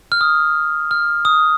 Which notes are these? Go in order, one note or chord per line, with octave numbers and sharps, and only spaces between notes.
F6
D#6
F6
D#6